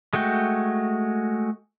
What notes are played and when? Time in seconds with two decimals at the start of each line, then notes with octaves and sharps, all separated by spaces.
0.13 G#3 A3 F#4 G5